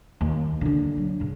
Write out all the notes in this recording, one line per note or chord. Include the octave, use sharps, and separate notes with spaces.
D#2
D3 D4
F#3
G2 C#3